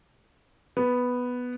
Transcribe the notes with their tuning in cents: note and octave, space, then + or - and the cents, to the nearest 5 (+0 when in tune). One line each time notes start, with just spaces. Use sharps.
B3 +0